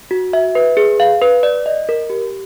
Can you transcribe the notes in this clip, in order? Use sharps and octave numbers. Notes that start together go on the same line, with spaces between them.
F#4
E5
B4
G#4
F5
B4
D5
D#5
A#4
G4